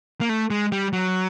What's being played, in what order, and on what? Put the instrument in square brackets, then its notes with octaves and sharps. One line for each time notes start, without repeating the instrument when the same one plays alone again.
[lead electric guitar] A#3
A3
G#3
G3
F#3